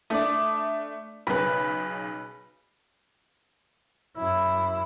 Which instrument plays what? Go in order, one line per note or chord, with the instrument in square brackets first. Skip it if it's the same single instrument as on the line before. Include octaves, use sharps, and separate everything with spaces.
[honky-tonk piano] A3 D4 [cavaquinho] D5 D#6
[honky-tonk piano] B1 C#3 [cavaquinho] B4 B5
[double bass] F#2 E4